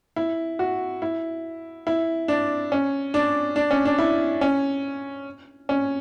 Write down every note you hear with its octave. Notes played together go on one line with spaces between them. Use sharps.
E4
F#4
E4
E4
D4
C#4
D4
D4
C#4
D4
E4
C#4
C#4